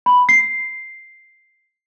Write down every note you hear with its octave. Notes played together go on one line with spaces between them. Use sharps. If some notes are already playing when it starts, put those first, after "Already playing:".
B5
C7